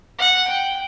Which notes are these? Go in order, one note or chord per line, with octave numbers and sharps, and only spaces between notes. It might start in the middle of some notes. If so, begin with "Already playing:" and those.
F#5
G5